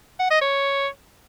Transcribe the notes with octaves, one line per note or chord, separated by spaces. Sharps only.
F#5
D#5
C#5